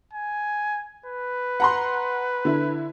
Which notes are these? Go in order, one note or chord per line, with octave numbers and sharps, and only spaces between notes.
G#5
B4
F#5 A#5 C6
D3 E4